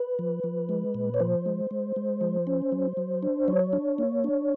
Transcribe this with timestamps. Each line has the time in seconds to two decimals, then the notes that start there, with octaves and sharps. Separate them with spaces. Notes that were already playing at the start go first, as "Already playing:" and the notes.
Already playing: B4
0.19 F3
0.44 F3
0.69 G#3
0.95 A#2
1.14 C#5
1.20 F3 C5
1.46 G#3
1.71 G#3
1.96 G#3
2.21 F3
2.47 C#4
2.72 F#3
2.97 F#3
3.23 D4
3.48 F#3 C#5
3.73 D4
3.98 A#3
4.24 D4